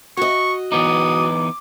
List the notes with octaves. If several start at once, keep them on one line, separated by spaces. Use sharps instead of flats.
F#4 D#5 C#6
E3 B3 D#4 D6 D#6